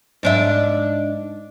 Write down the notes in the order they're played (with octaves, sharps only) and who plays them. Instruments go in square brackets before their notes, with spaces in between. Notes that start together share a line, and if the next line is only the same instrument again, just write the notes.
[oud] G#2 D4 E5